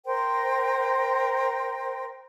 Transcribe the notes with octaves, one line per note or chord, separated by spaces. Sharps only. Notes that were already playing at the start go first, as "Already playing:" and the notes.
A#4 C5 G5